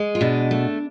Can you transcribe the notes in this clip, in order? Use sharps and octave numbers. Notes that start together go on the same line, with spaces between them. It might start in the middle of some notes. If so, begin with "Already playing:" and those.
Already playing: G#3
F4
B2 D4
A3